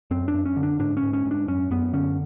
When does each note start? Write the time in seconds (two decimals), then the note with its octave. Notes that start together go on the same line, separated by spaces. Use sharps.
0.11 F#2 C4
0.28 D4
0.34 F#2
0.46 C#4
0.56 D3
0.63 D4
0.79 G#2 D4
0.97 C#4
1.02 G#2
1.13 C#4
1.25 G#2
1.31 D4
1.48 F#2 C#4
1.71 F#2 B3
1.93 D3 C#4